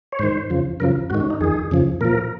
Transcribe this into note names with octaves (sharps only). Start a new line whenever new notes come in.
C#5
G#2 D#3 C5
F2 C#3 F3
F#2 C#3 F3 A#4
G#2 D#3 F#4
C#4
D#4
F2 D#3 G#4
F2 C#3 F3
A#2 F3 A#4